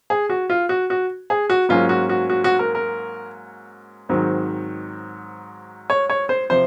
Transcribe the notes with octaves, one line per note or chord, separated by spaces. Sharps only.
G#4
F#4
F4
F#4
F#4
G#4
F#4
G#2 F#3 A#3 C#4 F4
F#4
F#4
F#4
F#4
A#4
A#4
G#2 D#3 F#3 C4
C#5
C#5
C5
C3 F3 C5